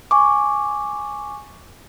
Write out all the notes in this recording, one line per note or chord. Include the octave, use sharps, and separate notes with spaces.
G#5 C#6 D6